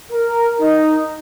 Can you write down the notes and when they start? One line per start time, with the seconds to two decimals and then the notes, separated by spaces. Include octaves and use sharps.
0.12 A#4
0.60 D#4